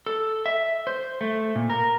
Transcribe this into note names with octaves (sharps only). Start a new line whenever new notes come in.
A4
E5
C5
A3
A#2
A#4